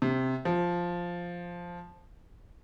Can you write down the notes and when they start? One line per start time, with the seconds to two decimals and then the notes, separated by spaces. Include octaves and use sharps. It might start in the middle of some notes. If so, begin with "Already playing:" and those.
0.02 C3
0.45 F3